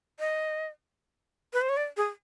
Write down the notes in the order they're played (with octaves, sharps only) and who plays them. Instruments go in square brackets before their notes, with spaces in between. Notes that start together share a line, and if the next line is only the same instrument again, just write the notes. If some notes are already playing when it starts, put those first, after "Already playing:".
[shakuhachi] D#5
B4
C5
C#5
D5
G#4